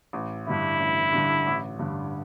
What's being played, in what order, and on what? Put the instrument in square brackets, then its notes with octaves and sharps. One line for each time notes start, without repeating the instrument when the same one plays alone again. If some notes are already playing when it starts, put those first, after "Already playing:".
[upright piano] A1
[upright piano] G2 D3 [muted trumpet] E4
[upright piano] A1
G2 D3
A1
G2 D3